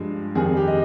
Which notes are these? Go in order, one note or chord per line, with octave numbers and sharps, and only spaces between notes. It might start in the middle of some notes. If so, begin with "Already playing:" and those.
Already playing: G2 F3 G#3
F2 D#3 G3 G#4
G#4
G4
D#5